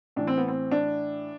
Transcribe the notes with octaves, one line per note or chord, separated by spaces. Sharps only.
A2 E3 D4
C4
B3
C4
D4